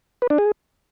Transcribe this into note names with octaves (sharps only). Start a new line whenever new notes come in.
B4
D4
G#4